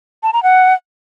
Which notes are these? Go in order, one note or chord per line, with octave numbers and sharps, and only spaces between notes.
A5
A#5
F#5